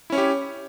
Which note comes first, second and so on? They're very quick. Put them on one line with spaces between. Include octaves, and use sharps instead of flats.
E4 C#4 C#5 G4